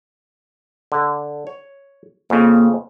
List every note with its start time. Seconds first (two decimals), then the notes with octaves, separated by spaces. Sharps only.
0.92 D3
1.47 C#5
2.30 F2 C#3 A#3